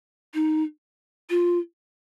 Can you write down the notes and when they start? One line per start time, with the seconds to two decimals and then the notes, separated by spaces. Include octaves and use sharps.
0.34 D#4
1.30 F4